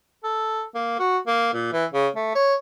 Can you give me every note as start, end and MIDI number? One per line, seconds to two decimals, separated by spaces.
0.24 0.63 69
0.75 0.96 58
0.99 1.17 66
1.27 1.51 58
1.53 1.72 46
1.73 1.85 52
1.94 2.08 49
2.16 2.30 57
2.35 2.55 73